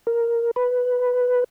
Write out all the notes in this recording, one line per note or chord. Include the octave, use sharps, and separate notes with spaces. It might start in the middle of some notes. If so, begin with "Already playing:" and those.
A#4
B4